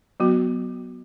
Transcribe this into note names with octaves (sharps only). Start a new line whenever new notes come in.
F#3 B3 F#4